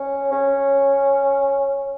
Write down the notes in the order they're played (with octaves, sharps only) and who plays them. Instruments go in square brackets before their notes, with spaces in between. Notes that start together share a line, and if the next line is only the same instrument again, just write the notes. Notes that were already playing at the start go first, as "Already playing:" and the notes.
Already playing: [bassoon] C#4
C#4